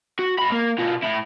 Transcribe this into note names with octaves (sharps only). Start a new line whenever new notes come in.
F#4
G#2 B5
A#3
B2 F4
A2 E4